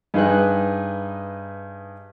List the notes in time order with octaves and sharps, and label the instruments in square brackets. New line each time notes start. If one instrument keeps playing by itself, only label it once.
[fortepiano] G2 D#4 G#4 B4 F#6